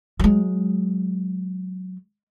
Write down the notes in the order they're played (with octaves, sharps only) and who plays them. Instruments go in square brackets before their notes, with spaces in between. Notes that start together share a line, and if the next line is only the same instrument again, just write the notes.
[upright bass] F#3 G#3